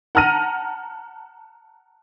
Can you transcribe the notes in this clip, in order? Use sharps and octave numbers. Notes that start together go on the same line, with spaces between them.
F#5 A5 A#5 F6 A#6 D#7